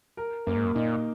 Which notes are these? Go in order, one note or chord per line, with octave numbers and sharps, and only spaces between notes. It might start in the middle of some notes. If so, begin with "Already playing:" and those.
A#4
F#2 A#3
G#2
F#2
A#2 D#4